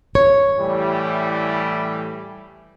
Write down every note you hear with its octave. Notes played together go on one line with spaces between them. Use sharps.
C#5
A2 E3 G3